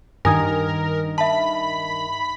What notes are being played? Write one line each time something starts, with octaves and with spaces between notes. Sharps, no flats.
G2 D#3 D#4 A#4 G#5 D#6 G#6
E5 A5 B5